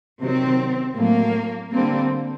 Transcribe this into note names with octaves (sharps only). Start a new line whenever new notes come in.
C3 D#3 F#3 C4
A2 F#3 A3 A#3
D3 G3 A#3 C4